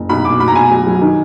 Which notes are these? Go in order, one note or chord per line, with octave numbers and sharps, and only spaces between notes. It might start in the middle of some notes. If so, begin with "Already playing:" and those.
Already playing: F#1
B1 B5
B2 D6
B2 B5
A#5
B2 G#5
F#3
F#3
D#3